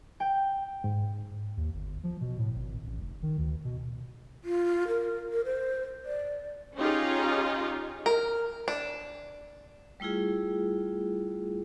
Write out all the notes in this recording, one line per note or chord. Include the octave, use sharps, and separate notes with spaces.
G5
G#2
D#2
G1
F3
B2
A2
G#1
A1
F1
D#3
D2
B2
F4
A#4
A#4
C5
D5
C#4 D#4 F4 G4 G#4
A#4
D4
G3 A3 E4 F4 G#4